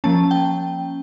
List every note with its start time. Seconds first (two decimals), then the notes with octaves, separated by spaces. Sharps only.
0.04 F3 A#3 C#4 A5
0.31 G5